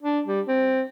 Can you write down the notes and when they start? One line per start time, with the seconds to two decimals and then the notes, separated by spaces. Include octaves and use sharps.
0.02 D4
0.27 G3
0.47 C4